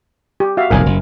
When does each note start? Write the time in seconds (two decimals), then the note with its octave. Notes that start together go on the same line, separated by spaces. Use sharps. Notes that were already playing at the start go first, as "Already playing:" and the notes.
0.40 G4
0.57 F#4 E5 F5
0.70 E1 B1 G#2 A#4 G#5
0.86 F#1